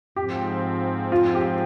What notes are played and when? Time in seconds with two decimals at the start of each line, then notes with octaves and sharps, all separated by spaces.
0.16 G#2 F3 C4 G4
1.12 F4
1.35 G4